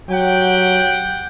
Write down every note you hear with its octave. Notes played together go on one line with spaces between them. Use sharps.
F#3 G4 F#5 G5